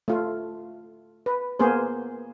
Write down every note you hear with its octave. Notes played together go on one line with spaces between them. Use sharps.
A3 F4
B4
A#3 B3 G#4 C5